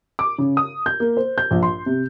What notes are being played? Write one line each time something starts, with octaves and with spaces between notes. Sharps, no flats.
D6
C#3
D#6
G6
A#3
C5
G6
A#1
C6
C3